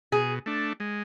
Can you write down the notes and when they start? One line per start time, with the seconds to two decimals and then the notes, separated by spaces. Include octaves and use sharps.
0.12 B2 G#4
0.46 A3 D4
0.80 G#3